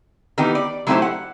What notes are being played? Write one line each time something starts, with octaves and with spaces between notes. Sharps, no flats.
D#3 E3 B3 D#4 G4
D5
F#3 A3 D#4 E4 G4 C5
F#5